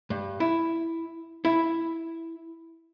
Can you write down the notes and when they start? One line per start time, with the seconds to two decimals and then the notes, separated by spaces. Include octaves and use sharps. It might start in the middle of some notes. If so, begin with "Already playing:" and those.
0.10 G2
0.40 E4
1.45 E4